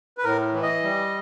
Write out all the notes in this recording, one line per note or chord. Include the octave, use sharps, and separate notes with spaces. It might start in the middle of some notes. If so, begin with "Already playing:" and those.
B4
A2 A#4
E3
D#5
G3